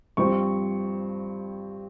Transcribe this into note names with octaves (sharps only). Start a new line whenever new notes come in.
G2 F3 C4 C#6